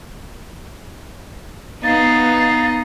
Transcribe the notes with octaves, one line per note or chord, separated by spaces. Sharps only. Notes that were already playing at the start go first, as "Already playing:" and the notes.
B3 D#4 F5 A6